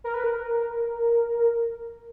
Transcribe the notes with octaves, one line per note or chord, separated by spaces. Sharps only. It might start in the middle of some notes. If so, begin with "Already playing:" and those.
A#4
B4
A#4